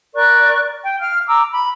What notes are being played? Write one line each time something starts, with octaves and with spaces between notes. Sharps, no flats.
A#4 D5 C#6 F#6
G5
F5 F6
A#5 D6 E6
B5